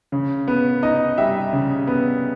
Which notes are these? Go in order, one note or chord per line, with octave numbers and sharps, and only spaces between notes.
C#3
B3
D#4 D#5
G3 E5
C#3
B3